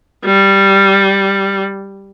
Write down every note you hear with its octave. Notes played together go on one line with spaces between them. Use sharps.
G3